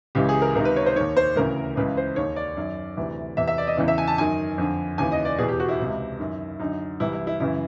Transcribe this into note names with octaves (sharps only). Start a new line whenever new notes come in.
C#2 C#3 E3 G4
G#4
A#4
C#2 C3 D#3 A#4
B4
C#5
C5
D#2 D#3 C#5
C5
D2 C#3 E3 A#4
C#2 C#3 E3 B4
C5
D#2 D#3 C#5
D5
F#2 D#3
D2 C3 E3
E2 C3 E3 E5
E5
D5
D#5
E2 C#3 E3
E5
G#5
A5
F#2 D#3 G#5
F2 D3
D#2 C#3 E3 G#5
D#5
D5
E2 B2 G#4
G4
F#4
E4
C#2 C3 E3
F#2 D#3
F#2 D3 D#4
C2 C3 E3 E4
E4
E4
F#2 C#3 E3 E4